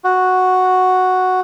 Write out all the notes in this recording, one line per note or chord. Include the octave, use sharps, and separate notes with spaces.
F#4